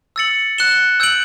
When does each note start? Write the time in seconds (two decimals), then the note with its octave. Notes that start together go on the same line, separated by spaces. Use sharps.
0.16 E6 A6 C#7 F#7
0.58 F#6 C#7 E7 G7
1.00 E6 G6 D7 F#7